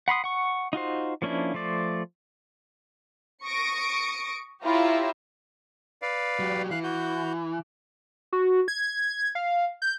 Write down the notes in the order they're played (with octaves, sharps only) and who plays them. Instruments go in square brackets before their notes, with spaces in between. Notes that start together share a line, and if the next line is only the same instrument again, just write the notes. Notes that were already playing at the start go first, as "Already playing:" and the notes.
[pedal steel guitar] F#5 B5 C6 D#6
F#5 C#6
D#4 F4 F#4 C5
F3 A#3 C#4 D4 E4
F3 A3 C5 D5
[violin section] C#6 D#6 A#6 C#7 D7
E4 F4 G4 C#5 E5 A#5
[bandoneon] B4 D5 F5
[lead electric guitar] F#3 G4
[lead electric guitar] E3 [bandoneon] F5 F#6
[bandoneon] F#4 G6
[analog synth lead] F#4
G#6
F5
G6